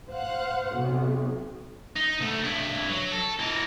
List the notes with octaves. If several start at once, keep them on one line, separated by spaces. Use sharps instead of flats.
C5 F5 F#5
B1 C3
D#4
D2 A3
G2 E4
F#3
A4
E3 A#4